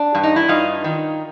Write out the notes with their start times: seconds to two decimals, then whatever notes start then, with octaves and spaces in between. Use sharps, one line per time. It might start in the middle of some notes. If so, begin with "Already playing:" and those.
Already playing: D4
0.15 G2
0.23 D#4
0.36 E4
0.48 G2 D#4 F4
0.84 D#3